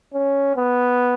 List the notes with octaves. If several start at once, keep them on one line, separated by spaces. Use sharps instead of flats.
C#4
B3